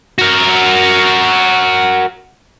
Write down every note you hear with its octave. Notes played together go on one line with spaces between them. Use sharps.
F#4 A#4